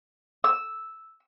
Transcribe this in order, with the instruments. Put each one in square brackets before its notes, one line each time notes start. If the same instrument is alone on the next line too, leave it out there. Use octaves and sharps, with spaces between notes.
[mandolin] E6